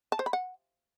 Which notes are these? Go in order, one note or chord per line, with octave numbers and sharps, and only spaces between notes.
A5
C5
B5
F#5